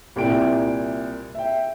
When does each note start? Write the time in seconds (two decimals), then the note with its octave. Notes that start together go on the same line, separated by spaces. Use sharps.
0.16 C2 A#2 E4 G5 D7
1.35 E5 G5